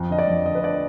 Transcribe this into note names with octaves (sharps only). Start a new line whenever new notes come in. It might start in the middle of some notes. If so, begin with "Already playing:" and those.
Already playing: F2
D3 D#5
D5
F2
D3 D#5
B4
D5